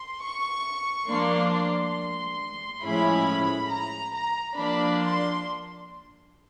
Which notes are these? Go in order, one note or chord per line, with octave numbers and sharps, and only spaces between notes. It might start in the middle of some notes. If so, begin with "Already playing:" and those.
Already playing: C6
C#6
F3 A#3 D4 C6
C6
A2 F3 G#3 C#4 E4 B5
A#5
A#5
F3 A#3 D4 B5
C6